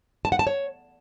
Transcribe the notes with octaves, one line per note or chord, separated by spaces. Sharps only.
A5
F#5
A5
C#5